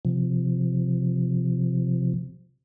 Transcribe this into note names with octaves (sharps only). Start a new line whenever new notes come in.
C3 F3